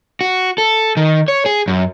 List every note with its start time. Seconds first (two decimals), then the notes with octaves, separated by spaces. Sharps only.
0.21 F#4
0.58 A4
0.97 D#3
1.28 C#5
1.46 G#4
1.68 F#2